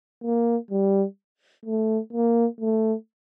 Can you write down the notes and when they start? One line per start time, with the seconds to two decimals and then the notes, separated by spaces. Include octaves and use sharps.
0.24 A#3
0.71 G3
1.66 A3
2.13 A#3
2.61 A3